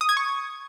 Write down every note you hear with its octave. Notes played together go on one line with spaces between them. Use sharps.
D#6
G#6
C#6